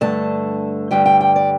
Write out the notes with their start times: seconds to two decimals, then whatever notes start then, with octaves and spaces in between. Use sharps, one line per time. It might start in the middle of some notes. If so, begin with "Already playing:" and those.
0.01 G2 D3 A3 A5
0.91 G2 D3 G3 G5
1.06 G5
1.21 G5
1.36 D5